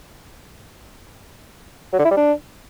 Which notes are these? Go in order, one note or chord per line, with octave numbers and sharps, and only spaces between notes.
F#3
D3
E4
G3
D4